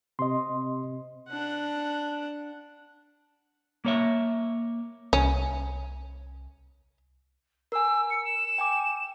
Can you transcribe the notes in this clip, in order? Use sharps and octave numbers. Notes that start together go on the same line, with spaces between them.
C3 D#5 C6
C3
D4 F#5
A#3 C#5 E5
C2 C#4
A#4 G#5 E6
C#7
E7
G5 G#5 D6